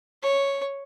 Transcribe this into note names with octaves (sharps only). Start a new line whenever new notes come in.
C#5